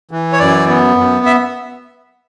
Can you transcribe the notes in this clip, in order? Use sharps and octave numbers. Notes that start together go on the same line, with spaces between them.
E3
C#5
F#2 D5
B3
F#2
E5